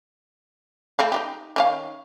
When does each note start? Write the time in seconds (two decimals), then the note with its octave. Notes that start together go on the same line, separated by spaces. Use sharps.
0.99 A3 C4 F5
1.12 D#4 F4 G4
1.56 D#3 C#4 F5